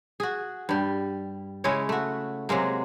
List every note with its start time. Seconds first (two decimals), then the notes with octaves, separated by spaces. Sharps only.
0.20 F#4 G#4
0.69 G2 G3
1.64 C#3 G#3 E4 C#5
1.89 A3 F#4
2.49 C3 F#3 G#3 A#3